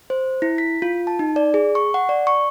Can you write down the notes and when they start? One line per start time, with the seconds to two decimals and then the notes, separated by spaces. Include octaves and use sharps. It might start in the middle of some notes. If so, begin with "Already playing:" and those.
0.10 C5
0.42 E4
0.58 B6
0.82 F4
1.07 A5
1.19 D#4
1.36 D5
1.54 G#4
1.75 C#6
1.94 F#5
2.09 D5
2.27 C#6